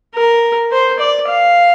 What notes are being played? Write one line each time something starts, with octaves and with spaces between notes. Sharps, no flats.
A#4
C5
D5
F5